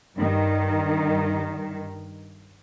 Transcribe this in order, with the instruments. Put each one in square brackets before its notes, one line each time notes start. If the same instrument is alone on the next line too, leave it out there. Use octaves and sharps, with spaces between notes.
[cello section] G2 D#3